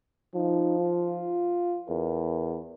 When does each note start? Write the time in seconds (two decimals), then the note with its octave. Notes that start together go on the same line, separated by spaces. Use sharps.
0.35 F3 D#4
0.80 F4
1.89 E2 A#4